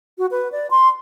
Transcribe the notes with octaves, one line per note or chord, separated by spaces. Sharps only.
F#4
B4
D5
C6